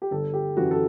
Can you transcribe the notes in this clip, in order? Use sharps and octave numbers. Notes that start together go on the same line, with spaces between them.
G4
G1 A4
G4
F#2 E3 F#4
A4